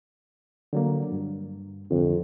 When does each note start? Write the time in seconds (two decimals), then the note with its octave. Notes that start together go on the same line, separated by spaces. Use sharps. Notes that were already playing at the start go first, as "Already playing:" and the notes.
0.73 D3 F#3 A#3
1.12 G2
1.91 C2 F2 D3